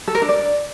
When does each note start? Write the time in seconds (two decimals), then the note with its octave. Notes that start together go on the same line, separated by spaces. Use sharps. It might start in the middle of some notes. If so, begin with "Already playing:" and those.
0.08 A4
0.15 A#4
0.22 D4
0.29 D5